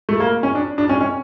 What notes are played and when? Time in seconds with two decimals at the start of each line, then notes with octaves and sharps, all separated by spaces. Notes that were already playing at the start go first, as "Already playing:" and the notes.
0.09 A3
0.20 A#3
0.43 C#4
0.55 D4
0.78 D4
0.89 C#4
1.00 C#4